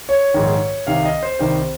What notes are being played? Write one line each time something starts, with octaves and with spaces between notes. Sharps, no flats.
C#5
A#1 G#2 D#3
C2 C3 D#3 F5
D#5
C5
C2 C3 D#3 C5